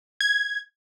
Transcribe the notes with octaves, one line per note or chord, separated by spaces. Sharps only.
G#6